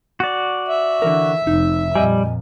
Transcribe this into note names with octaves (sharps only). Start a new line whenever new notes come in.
F#4 D5
E5
D3 E3 A#4
F1 D#4
F2 A#2 G3 D#5 G#5